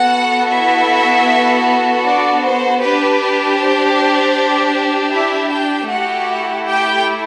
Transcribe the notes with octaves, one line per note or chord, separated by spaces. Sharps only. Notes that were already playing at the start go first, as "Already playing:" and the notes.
Already playing: B3 F#4 A4 F#5
E4 E5
D4 D5
C5
D4 G4 B4
C5
E4 E5
G4 G5
A3 E4 F#4 G4 F#5
G4 G5